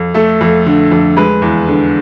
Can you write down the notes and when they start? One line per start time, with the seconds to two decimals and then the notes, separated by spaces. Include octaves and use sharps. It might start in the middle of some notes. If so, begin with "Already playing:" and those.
Already playing: F2
0.14 A3 A4
0.41 F2
0.66 D3
0.91 F2
1.17 G#3 B4
1.42 E2
1.68 D3